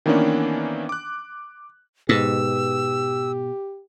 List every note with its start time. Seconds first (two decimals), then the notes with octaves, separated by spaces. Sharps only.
0.06 D#3 E3 A#3 B3 C#4 D4
0.89 D6 F#6
2.09 G#2 B2 G4 E6